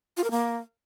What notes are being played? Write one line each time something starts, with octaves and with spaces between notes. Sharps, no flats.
F4
A#4
A#3